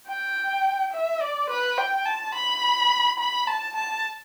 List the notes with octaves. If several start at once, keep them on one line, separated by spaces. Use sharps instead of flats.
G5
E5
D5
B4
G5
A5
B5
B5
A5
A5